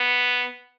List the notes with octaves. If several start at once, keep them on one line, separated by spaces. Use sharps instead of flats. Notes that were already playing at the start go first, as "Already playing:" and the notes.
Already playing: B3